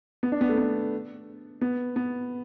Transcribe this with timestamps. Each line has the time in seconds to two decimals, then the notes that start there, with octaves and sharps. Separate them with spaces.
0.23 B3
0.32 D4
0.41 B3
0.49 A3
0.58 B3
1.61 B3
1.96 B3